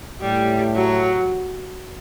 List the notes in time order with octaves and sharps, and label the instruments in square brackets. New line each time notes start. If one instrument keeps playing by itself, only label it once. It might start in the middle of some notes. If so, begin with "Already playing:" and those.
[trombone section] A2 [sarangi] G3
[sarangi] F#3